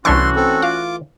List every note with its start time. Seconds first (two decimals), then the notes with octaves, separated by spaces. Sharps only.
0.05 C2 E3 A3 C#4 D4 F#4 C6 C#6
0.36 C4 A4
0.62 F4 F5 D6